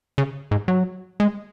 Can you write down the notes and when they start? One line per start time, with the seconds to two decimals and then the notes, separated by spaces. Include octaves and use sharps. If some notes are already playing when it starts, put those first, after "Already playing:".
0.18 C#3
0.51 G#2
0.68 F#3
1.20 G#3